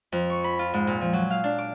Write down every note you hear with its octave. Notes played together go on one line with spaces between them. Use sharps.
F2
C#6
B5
F4
G#2
A#2
F3
F#3
F5
D4
D6